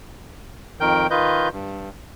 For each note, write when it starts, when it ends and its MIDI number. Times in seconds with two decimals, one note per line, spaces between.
0.80 1.07 41
0.80 1.07 51
0.80 1.07 70
0.80 1.07 79
0.80 1.07 91
1.11 1.49 51
1.11 1.49 65
1.11 1.49 71
1.11 1.49 75
1.11 1.49 91
1.52 1.89 43